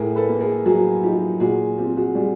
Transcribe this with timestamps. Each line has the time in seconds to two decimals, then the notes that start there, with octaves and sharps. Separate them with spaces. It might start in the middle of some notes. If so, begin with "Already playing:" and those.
Already playing: A2 G#4 A#4
0.16 A4 B4
0.28 A#3
0.40 G#4 A#4
0.66 F#3 F#4 G#4
1.03 D#4 F4 G4
1.40 A#2 F#4 G#4
1.78 C4 F4 G4
1.97 F#4 G#4
2.15 G3 F#4 G#4